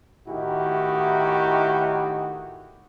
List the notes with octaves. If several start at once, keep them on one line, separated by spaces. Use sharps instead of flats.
A2 D#3 D#4 E4 F#4 G4